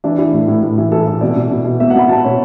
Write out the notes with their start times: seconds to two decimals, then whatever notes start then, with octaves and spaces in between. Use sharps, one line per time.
0.04 E3 D4
0.18 E3 E4
0.33 A2
0.48 A2
0.63 A2
0.78 E3
0.92 E3 A4
1.07 E3
1.21 B2 D5
1.36 B2
1.51 B2
1.65 B2
1.80 B2 E5
1.90 F#5
1.95 B2 B5
2.09 B2 A5
2.24 B2 C#5